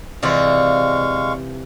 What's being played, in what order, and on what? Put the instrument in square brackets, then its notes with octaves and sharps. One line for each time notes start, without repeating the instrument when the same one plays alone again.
[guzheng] C3 E3 F4 [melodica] G#3 F5 C#6 [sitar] C4 D5